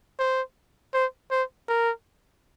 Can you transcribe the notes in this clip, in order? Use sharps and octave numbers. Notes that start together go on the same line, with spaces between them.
C5
C5
C5
A#4